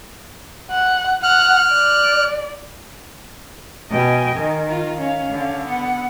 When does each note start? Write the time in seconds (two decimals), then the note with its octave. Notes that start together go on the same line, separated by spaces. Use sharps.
0.71 F#5
1.23 F#5 F6 F#6
1.72 D5
3.90 B2 D#5 G5 G#5
4.36 D#3
4.69 F4
4.99 C#4 F5
5.31 D3
5.66 B3 F#5